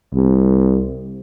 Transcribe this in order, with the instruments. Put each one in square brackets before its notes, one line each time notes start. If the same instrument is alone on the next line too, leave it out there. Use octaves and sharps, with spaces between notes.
[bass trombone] C2